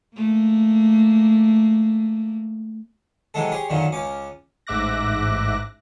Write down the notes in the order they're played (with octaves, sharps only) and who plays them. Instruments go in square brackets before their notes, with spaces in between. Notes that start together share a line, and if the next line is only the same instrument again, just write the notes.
[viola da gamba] A3 A#3
[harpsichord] C3 E3 F#3 G#3 A4
G4 G#4 C#5 C6
F#2 A#2 D3 D#3 F#3
C#2 C#4 D6
[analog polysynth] A1 G#2 E5 D6 F#6 A#6